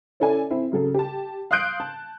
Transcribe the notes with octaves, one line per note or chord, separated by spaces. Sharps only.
C#4 E4 A4 D5 G#5
C4 E4
C#3 F#3 G#4 A4
G4 A5
F5 C6 D#6 F#6 G6 D7
A5